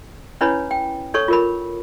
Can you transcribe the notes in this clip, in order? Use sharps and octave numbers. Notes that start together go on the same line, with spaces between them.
C#4 D4 E4 B4 C#5 B5
G5
D#4 A4 C#5 C#6
F4 A#4 B5